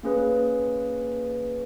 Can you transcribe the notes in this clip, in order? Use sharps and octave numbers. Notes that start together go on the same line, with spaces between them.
A#3 C#4 G#4 B4